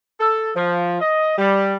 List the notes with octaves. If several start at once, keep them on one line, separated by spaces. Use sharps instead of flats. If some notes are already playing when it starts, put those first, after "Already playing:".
A4
F3
D#5
G3